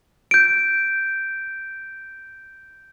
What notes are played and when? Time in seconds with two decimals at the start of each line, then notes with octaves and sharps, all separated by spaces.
0.31 G6 D7